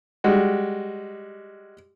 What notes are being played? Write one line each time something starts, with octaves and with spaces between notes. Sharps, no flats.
G3 G#3 F#4